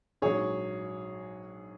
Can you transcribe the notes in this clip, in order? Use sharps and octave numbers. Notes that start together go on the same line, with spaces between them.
A#1 G#2 F#3 G#4 C#5